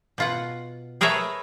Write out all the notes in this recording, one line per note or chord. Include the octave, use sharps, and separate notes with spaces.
B2 F4 F#5
G#4 A#4 B4 C#5 E5 A5